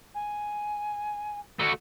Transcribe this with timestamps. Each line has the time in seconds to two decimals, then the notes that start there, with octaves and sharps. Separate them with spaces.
0.14 G#5
1.60 A3 F#4